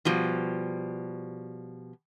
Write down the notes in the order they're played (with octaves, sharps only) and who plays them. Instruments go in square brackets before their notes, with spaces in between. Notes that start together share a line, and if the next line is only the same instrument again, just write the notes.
[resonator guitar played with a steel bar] B2 F3 G3